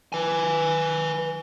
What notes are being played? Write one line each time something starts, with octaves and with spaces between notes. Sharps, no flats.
B4 G#5